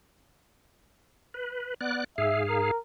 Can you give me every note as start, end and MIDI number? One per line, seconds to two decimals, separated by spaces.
1.34 1.74 71
1.81 2.04 59
1.81 2.04 74
1.81 2.04 90
2.18 2.71 44
2.18 2.71 68
2.18 2.40 76
2.18 2.71 77
2.49 2.78 70